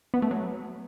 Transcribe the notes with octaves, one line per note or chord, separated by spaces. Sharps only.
B3
A3
F#3